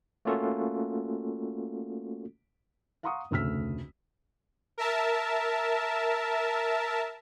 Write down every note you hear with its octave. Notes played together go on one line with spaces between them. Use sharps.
A3 A#3 C#4 F4 F#4 A4
F5 F#5 A#5 C6 C#6 D#6
F1 D2 C#3 E6 F6 B6
A#4 E5 A5